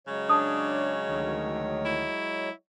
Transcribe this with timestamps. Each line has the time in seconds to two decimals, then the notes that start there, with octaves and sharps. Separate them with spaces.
0.07 C#3 F#3 G#3 C#5
0.29 D4 A5 D#6
1.09 D2 D#3
1.85 E4